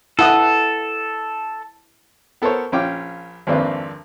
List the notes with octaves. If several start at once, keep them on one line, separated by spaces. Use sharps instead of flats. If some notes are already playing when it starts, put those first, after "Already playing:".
E4 A4 F#5 D#6
B3 A4 A#4 C5 C#5
A#1 C#4 F4 G5 D6
G#1 F2 A#3 C4 D4 B4